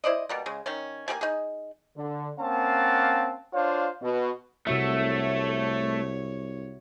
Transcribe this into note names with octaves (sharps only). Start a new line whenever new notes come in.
E4 C5 D5 D#5
B2 G3 A#3
C#3 G#3
D#3 C#4
A#3 C#4 G4 G#5
D#4 G#4
D3
A#3 C4 C#4 F5 F#5 A5
D4 F4 C5 C#5 F5
B2
C2 C3 A3 F#4 C#5 E5